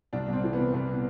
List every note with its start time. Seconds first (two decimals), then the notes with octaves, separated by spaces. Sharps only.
0.13 C2 D4
0.28 C2 C4
0.44 E3
0.53 C3 B3
0.73 C2 B3